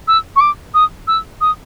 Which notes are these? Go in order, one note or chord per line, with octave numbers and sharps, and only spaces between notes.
E6
C#6
D6
D#6
E6
D#6